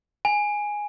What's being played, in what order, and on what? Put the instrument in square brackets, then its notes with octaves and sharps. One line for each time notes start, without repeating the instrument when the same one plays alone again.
[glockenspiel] G#5